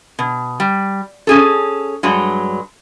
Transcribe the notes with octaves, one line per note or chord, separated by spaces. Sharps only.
B2
G3
C#4 G#4 A4
G2 F#3 G#3